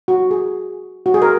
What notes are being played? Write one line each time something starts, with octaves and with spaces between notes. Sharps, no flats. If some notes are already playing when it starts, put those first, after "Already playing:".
F#4
G#4
F#4
G#4
A#4